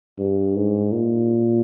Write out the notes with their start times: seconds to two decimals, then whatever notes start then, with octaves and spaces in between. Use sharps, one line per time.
0.19 G2
0.56 G#2
0.92 A#2